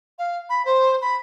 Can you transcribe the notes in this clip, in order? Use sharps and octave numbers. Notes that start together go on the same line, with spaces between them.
F5
B5
C5
B5